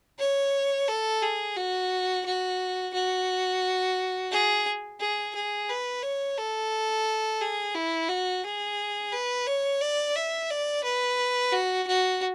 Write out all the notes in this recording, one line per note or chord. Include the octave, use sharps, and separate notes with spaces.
C#5
A4
G#4
F#4
F#4
F#4
G#4
G#4
G#4
B4
C#5
A4
G#4
E4
F#4
G#4
B4
C#5
D5
E5
D5
B4
F#4
F#4